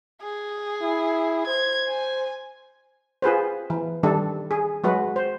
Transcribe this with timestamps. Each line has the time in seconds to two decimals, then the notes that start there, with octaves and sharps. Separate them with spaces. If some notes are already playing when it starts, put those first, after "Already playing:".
0.22 G#4
0.81 E4
1.47 C5 G#6
1.89 G#5
3.22 F4 G#4 B4 C5
3.70 E3
4.03 D#3 G3 D4 A4
4.51 G#4
4.84 F#3 G#3 F#4 B4
5.16 C5